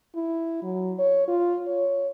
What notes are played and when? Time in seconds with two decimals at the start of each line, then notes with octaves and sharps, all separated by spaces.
0.15 E4
0.63 F#3
0.99 C#5
1.28 F4
1.67 C#5